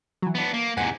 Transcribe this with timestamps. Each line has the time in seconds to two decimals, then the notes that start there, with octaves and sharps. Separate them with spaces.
0.22 E3 F#3
0.35 B3 D4
0.54 A#3
0.77 E2 G#2 C3 F#5 G#5